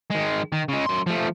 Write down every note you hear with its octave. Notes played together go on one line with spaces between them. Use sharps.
D#3 G#3
D#3
C#3 G#3
F#2 C6
F3 A3